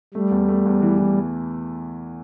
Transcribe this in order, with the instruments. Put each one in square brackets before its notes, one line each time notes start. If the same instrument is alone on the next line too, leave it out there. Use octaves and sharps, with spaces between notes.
[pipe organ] G3 [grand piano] A3
[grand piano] E2
A3
E2
E3
E3